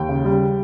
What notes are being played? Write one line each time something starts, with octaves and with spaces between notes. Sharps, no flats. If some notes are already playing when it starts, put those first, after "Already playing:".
Already playing: D#2 G5
C#3
G3